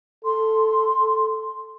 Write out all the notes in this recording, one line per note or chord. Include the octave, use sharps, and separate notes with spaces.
A4 C6